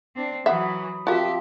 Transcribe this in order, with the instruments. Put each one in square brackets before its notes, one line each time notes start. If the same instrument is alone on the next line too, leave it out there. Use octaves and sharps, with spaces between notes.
[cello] C4 D4
[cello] E3 F#3 [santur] B4 B5 D#6 [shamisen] E5 F#5
[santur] F3 C4 [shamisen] F#4 A#4 [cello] G4 E5